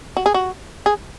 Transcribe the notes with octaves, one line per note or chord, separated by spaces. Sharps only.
F#4
G#4
F#4
G#4